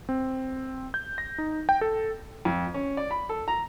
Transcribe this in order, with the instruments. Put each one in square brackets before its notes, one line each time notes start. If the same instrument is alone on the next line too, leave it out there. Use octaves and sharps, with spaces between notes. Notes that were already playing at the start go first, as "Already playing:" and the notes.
[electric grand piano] C4
G6
A#6
D#4
G5
A4
[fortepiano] F2
C#4
D5
B5
A4
A#5